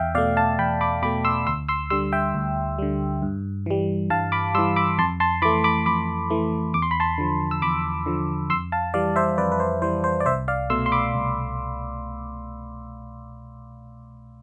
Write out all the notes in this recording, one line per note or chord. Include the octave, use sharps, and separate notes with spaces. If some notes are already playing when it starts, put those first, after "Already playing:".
Already playing: E2 E5 F5 G5
B2 A3 D5 F5
F5 A5
E2 G5 B5
B5 D6
B2 A3 B5 D6
C6 E6
D2 C6 E6
C6 E6
D3 G3 C6 E6
E5 G5
D2
D3 G3
G2
E3 G3
G2 F5 A5
B5 D6
E3 G3 C6 E6
B5 D6
F2 A5 C6
A5 C6
E3 A3 B5 D6
B5 D6
F2 B5 D6
E3 A3
E2 D6
C6
B5
A5 C6
D3 F3
E6
E2 B5 D6
D3 F3
F2 C6 E6
F5 A5
E3 G3 D5 F5
C5 E5
F2 B4 D5
B4
C5
E3 G3 C5
C5
D5
C2 C5 E5
D5 F5
B2 A3 C6 E6
C6
B5 D6
C2